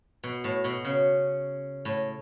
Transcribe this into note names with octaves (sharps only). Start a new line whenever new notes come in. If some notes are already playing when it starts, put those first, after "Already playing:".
B2
A2
B2
C#3
A2